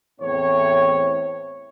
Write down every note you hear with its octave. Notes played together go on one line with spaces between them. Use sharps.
E2 A2 C4 C#5